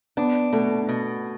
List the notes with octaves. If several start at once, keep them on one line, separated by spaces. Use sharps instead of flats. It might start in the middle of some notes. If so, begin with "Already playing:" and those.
B3 D4
B2 A3
B2